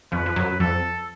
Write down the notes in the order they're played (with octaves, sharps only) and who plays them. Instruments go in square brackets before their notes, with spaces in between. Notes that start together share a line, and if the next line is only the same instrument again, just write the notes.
[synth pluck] F2 F3 [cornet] B4
[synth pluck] F3
F#2 F#3
[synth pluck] F2 F3 [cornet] A4